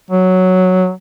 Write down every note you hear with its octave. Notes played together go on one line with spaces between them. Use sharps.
F#3